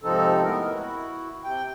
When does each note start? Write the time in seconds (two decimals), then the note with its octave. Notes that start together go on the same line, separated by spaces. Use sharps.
0.03 G#2 C3 F3 C4 D#4 A4
0.43 A2 G#3 B3 A#4
0.71 E4 F#4
1.44 C3 G5